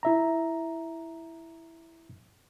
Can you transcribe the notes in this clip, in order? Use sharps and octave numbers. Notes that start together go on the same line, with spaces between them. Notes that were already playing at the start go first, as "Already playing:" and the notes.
E4 E5 A#5